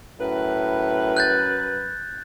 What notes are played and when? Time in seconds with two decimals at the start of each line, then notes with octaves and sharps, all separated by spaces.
0.21 F#2 A2 B4
1.17 F#6 G6 A6